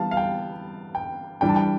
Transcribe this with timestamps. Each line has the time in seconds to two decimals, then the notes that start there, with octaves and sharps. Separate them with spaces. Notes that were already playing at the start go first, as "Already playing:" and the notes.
Already playing: E3 G3 B3 F5 A5
0.11 F5
0.17 G5
0.95 G5
1.41 E3 G3 D4 G5
1.49 A5
1.56 G5